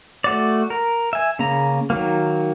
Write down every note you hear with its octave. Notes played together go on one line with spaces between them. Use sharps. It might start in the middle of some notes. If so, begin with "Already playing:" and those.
A3 F#4 D5
A#4
E5 G#5
C#3 A#3 A#5
D#3 F#3 A#3